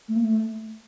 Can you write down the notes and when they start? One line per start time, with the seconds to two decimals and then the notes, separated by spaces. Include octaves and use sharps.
0.09 A3
0.16 A#3
0.24 A3